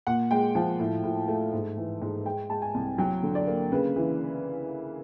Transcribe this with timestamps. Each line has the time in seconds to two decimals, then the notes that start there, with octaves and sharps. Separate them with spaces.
0.07 A#2 F#5
0.31 G#3 G5
0.55 F3 G5
0.80 A2
1.04 A2
1.28 A3
1.53 G#2
1.77 E3
2.01 G#2
2.25 G#3 G5
2.49 G#3 A5
2.62 G#5
2.74 C2
2.98 F#3 G5
3.23 D3
3.35 D5
3.47 A#3
3.72 C#3 B4
3.96 E3